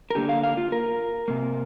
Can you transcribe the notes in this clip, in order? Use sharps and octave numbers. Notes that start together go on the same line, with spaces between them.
A#4
D3 A#3 G4
F5
F5
F4
A#4
C3 A#3